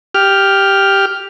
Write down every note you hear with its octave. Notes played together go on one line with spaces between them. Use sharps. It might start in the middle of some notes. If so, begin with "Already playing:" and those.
G4 F6